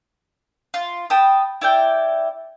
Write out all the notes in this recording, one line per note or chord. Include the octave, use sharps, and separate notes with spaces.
F4
G5 A5 B5 D#6
E4 D5 G5